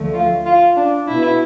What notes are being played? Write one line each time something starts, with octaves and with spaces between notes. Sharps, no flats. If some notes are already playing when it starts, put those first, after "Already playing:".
Already playing: D2 D3 F3 A3
F4
F4
D4
B2 B3 E4